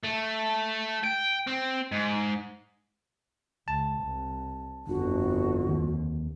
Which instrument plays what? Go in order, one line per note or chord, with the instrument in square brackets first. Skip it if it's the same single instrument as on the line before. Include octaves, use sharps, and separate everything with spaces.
[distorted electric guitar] A3
G5
C4
G#2
[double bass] C#2 [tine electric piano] A5
[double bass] C2
[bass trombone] G1 [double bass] F2 D3 [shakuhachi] F#4
[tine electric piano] D#2